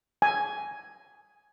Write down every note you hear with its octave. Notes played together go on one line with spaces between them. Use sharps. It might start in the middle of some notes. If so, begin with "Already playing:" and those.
G#5